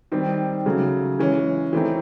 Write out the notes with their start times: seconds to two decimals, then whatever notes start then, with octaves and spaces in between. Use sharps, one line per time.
0.12 D#3 G3 C4
0.66 C#3 F#3 A3
1.19 E3 G#3 C#4
1.73 E3 A3 C4 D#4